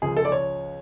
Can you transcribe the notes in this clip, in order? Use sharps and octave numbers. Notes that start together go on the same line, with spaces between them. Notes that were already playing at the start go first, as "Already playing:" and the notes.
C#2 C#3 F3 G#4
A4
D5
C#5